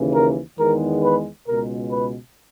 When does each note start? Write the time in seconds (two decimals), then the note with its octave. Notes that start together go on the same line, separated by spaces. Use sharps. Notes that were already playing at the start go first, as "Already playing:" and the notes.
Already playing: D#2 C#3 E3
0.14 A#4
0.59 E2 D#3 G#3 B3 A#4
1.03 B4
1.48 C#2 B2 G#3 A#4
1.91 B4